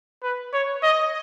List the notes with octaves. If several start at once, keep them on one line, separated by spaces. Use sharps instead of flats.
B4
C#5
D#5